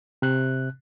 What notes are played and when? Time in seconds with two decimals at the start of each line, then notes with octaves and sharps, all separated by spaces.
0.22 C3 F#6